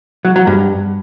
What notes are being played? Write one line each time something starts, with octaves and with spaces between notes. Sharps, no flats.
F#3
F#3
G2